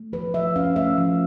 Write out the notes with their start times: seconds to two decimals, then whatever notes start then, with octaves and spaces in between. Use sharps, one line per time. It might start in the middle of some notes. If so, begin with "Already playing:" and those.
Already playing: A3
0.13 F3 B4
0.34 F3 E5
0.56 C#4 F5
0.76 A3 E5
0.98 F3